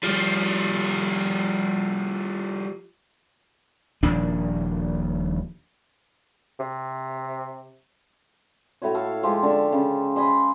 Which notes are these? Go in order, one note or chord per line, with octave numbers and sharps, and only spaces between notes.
F3 G3
D#1 A#2 F3 D4
C3
A2 E4 F#4 C#5
A4 F5 C#6
F3 G#3 F4 G4
D3 A4 C#6
C#3
C5 D#5 G#5 B5